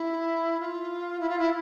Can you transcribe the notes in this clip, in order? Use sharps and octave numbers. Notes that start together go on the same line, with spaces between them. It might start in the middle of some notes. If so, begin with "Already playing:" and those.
Already playing: E4
F4
E4
F4
E4